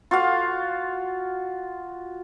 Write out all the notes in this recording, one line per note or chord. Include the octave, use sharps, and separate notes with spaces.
F4 F#4 F5